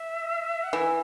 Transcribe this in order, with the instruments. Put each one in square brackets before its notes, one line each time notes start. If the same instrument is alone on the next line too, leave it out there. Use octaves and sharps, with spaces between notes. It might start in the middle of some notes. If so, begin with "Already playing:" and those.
Already playing: [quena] E5
F#5
[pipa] E3 [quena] E5